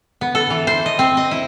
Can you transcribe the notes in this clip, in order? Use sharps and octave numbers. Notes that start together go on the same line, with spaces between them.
B3
A4
E3
C5
D#5
C4
D#5
E4